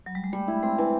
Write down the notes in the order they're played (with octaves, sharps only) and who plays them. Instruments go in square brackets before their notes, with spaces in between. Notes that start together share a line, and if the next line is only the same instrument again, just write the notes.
[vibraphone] F#3
G3
G#3
[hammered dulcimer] G3 [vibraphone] A3
[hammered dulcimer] E4
[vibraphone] G#3 [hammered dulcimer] C4
[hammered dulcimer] E3